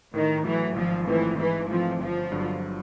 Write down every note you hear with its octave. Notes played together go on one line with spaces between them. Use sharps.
A2 D#3
E3 F#3 A3
G#1 F3
G#2 E3 F3 A3 C4
G#2 E3
E3 F3 A3 C4 F4
G1 F3
G2 D3 F#3